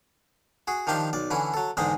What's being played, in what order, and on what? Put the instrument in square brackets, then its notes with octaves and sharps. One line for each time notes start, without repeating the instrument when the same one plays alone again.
[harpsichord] F#4 G#4
D#3 F3 D4 G4 F5 G5
B1 D5
D3 E3 C#4 E4
F#3 A4
E2 G#2 D3 G#3 D#5 G5